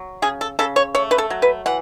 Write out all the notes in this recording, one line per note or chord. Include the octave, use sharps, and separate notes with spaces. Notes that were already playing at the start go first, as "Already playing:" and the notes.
Already playing: F#3
C#3 G#4
A4
C#3 A4
C#5
A3 C#5
B4
A4
F#3
B4
E3 F#5